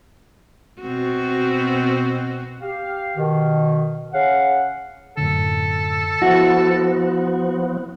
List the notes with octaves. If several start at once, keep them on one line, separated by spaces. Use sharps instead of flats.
B2 C4 F#4
G4 F5
B2 D#3
C#3 F5 F#5
F#2 A2 D3 A4
F3 B3 E4 F#4